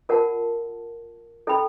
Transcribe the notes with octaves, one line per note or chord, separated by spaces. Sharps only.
F4 A#4 D5 F#5 A5
E4 A4 D5 G5 B5